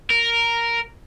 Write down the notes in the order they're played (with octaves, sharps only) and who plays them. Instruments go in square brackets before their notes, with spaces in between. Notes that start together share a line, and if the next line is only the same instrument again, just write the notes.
[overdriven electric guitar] A#4